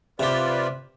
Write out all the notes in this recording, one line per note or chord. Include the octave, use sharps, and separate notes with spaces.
C3 F4 G4 B4 D5